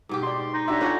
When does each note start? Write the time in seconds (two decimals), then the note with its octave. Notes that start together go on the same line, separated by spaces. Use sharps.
0.09 G#2 B2 G4
0.23 D#4 D5 C6
0.54 D#4
0.68 D4 F#4 G4 C#5 E5
0.81 C#4 F4 A4 C#5 F#5